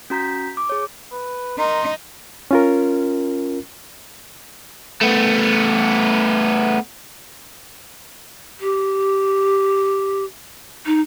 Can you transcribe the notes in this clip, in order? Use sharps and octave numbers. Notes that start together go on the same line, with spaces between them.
C#4 F#4 A#5 G6 B6
D6
G#4 C#5
B4
D#4 A#4 C6
C#4 F4 A#4
A3 B3
G4
D#4